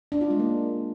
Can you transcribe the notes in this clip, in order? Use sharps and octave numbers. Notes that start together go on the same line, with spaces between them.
D4
F4
G#3
A#3